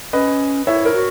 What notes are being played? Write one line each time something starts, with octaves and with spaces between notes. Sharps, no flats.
C#4 B4 D#5
E4 C#5 E5
A#4 C#5
F#4